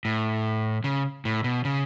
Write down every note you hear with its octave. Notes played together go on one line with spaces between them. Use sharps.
A2
C#3
A2
B2
C#3